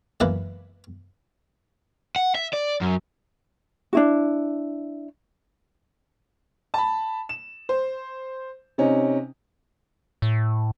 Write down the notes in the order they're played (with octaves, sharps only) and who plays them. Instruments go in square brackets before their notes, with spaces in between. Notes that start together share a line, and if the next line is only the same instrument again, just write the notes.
[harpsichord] C#2 F#2 E3 A#3 E4 B4
[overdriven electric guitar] F#5
E5
D5
F#2
[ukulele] D4 E4 F#4
[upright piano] A5 B5
E7
C5
C3 C#4 D#4
[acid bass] A2